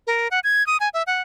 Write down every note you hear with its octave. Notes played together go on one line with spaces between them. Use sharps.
A#4
F#5
G#6
D#6
G#5
E5
F#5